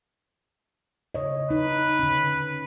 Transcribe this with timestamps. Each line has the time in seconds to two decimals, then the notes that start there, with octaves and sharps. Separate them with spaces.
1.14 C#3 C#5 D#5
1.51 D#4 B4
1.99 D3 C#4